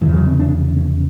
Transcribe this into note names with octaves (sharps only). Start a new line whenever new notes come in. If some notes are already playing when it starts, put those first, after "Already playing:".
F1 E2 C#3 E3
F#3
C4
D4
C#4
C#4